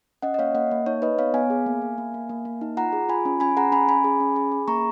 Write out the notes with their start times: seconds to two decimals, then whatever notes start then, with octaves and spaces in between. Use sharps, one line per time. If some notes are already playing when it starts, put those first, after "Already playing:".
0.22 C#4 D#5 F#5
0.34 D#5
0.39 A#3 C#5 F5
0.55 A#3 D#5 F#5
0.71 A#3
0.86 D#4 C#5
1.02 D#4 B4 D#5
1.18 B3 C#5 F5
1.34 B3 F5 G#5
1.50 G#4
1.66 A#3
1.82 A#3
1.98 A#3
2.14 A#3
2.29 A#3
2.45 A#3
2.61 D#4
2.77 F4 F#5 A#5
2.92 G#4
3.09 F4 G#5 B5
3.25 C#4
3.40 C#4 G#5 B5
3.57 G#4 F#5 A#5
3.72 C#4 G#5 B5
3.88 C#4 G#5 B5
4.04 G#4
4.20 C#4
4.36 G#4
4.52 G#4
4.68 A#3 A#5 C#6